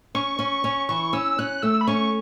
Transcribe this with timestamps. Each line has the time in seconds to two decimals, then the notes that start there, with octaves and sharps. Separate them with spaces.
0.15 C#4 C#6
0.39 C#4
0.64 C#4
0.89 E3 C#6
1.13 C#4 E6
1.39 C#4 F#6
1.62 A3 E6
1.81 B5
1.87 C#4 C#6